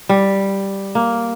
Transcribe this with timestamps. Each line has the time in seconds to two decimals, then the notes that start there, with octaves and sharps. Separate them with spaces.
0.09 G3
0.95 A#3